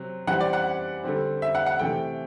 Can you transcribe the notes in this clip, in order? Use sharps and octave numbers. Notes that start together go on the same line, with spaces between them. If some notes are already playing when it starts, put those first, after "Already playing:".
Already playing: C3 F#3 C4
E3 G3 C4 F#5
D5
F#5
D3 G3 C4
E5
F#5
F#5
C3 E3 A3 G5